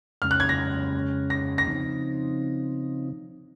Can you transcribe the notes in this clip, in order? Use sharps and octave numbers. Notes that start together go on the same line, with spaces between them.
F2 C#3 G#3 C#4 F6
F#6
G#6
A#6
A#6
A#6
C#3 F3 C4 D#4